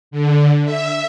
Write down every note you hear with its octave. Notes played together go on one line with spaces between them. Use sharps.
D3
E5